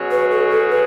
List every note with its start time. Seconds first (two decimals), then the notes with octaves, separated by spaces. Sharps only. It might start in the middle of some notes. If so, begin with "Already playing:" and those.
Already playing: B2 F#3 C#4 G#4
0.12 B4
0.31 A4
0.51 A4
0.71 B4